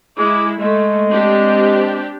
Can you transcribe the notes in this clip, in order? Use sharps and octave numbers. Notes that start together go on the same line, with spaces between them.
G#3 E4 D6
G#3 A3
C4 D4 G4